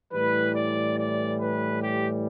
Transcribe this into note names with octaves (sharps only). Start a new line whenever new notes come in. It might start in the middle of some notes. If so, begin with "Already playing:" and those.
A2 E3 G3 B4
D5
D5
B4
G4